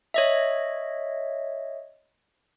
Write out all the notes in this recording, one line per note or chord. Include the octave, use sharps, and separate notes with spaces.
C#5 D#5 E5